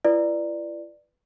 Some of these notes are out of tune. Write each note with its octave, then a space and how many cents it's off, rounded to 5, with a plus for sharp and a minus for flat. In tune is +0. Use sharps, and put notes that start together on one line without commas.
E4 +40 B4 +0 D5 +10